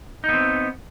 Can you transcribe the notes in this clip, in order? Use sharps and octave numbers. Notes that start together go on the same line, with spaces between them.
B3 C4 D#4